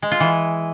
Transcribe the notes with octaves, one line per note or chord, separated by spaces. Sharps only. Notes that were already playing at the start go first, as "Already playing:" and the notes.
G#3
F4
E3